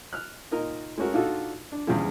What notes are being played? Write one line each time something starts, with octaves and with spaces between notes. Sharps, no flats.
F6 F#6
A#2 D#4 A#4 D#5
G#3 A3 C#4 F#4 A#4
A#2 D4 D#4 F4 F#4 A4
D4
E2 G2 C#3 F3 G#3